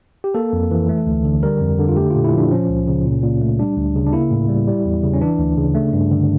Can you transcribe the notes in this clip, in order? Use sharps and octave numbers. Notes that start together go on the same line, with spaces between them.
G4
A#3 A4
F2
E3
A3
D2
D3
G3 A#4
F2
D3
F4
A3 G4
A#2 F4
E4
F3 D4
F3 C#4
C#2
C#3
A#2
A#2
A3
G3 D4
D2
C#3
D4
A#3 E4
A2
G3
G3
E2
C#3
C#4
E3 D4
D2
C#3
A3
G2
D3